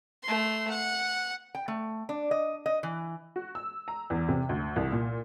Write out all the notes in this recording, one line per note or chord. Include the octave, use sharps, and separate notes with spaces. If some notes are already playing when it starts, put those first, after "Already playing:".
A3 C6
F#5
G5
A3
D4
D#5
D#5
E3
F#4
E6
A#5
E2
C3
D2
C2
A#2